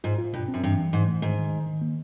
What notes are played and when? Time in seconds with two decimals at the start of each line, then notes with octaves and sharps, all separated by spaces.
0.04 G#2 F4
0.18 F4
0.33 G2 B2
0.48 C4
0.54 F#2
0.63 G2 E3
0.78 E3
0.93 G#2 E3
1.08 A3
1.22 G#2 D#3
1.37 D#3
1.52 D#3
1.67 D#3
1.82 A#3